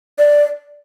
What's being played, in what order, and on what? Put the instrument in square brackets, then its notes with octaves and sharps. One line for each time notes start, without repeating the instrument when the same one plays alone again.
[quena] D5